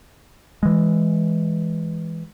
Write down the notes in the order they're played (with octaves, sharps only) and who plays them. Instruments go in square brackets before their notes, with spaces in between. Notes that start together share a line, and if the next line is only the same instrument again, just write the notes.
[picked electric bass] E3 G#3